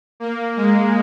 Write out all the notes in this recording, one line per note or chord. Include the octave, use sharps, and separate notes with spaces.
A#3
G#3